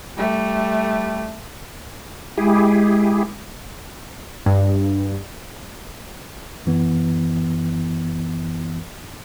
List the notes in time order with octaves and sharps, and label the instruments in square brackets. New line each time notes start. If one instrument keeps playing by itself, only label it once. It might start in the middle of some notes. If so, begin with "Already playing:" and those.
[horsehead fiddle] G3 A3
[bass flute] G#3 [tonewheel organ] E4 G4 G#4
[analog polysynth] G2
[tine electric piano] F#2 E3 B3